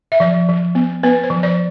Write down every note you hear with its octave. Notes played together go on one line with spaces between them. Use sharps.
E5
F3 D5
F3
B3
B3 B4
C5
F3
D5